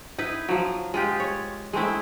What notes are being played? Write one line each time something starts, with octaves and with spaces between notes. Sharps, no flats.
D#4 E4 B4
F3 F#3
G#3 F4 G4
C#5
G#3 A3 C4 E4